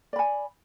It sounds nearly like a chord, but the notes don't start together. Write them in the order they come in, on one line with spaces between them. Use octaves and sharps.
D5 B5 G#5